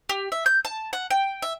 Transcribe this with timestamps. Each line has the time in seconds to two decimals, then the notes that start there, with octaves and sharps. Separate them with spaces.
0.09 G4
0.32 E5
0.46 G6
0.65 A5
0.93 F#5
1.10 G5
1.42 E5